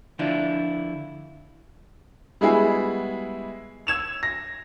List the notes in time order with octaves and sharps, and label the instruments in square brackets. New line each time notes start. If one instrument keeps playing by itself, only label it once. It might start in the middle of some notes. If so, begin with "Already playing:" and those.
[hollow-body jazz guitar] D3 F3 D4 E4 F4
[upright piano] G3 G#3 B3 E4 F#4 G#4
E6 G#6 E7 F7
A#6